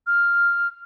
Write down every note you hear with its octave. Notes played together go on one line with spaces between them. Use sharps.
F6